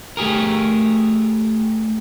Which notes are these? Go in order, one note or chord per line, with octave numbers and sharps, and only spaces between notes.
A3 G4 G#4 A#4